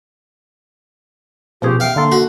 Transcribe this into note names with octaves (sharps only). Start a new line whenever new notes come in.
B2 F3 C#4 G4 G#4 C5
E5 F5 G5
D3 A#3 A4 C6
F#4